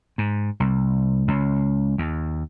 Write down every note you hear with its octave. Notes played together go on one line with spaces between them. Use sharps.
G#2
C2
C#2
D#2